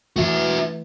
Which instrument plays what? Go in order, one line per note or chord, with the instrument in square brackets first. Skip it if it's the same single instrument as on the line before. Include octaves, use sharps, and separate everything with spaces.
[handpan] E3 A3 [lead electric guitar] F#4 E5